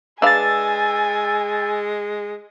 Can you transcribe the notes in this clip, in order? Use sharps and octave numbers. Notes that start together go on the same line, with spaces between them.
G#3 D4 B4 F5 G#5 E6 A6